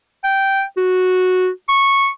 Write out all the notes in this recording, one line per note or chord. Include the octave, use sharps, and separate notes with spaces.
G5
F#4
C#6